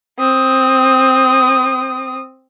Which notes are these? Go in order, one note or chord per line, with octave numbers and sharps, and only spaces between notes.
C4 D#6